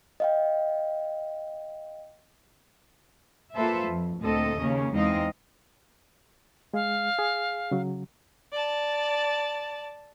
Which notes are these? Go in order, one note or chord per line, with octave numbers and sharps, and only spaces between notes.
D#5 F5 G5
A#3 F4 A4 B4 C5 E5
F2
D2 A#2 C4 A4 D#5
D#2 C#3 A#3 C#4
E2 G#3 C4 D#4 D#5 F5
G#3 G#4 F5
G#4
C#3 F#3
D5 A5